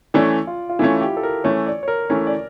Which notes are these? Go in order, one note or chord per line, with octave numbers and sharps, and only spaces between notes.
E3 A3 C#4 D5
F4
F4
E3 A3 C#4 E4
G4
A4
A#4
E3 A3 C#4 C#5
D5
C#5
A#4
E3 A3 C#4 C#5
D5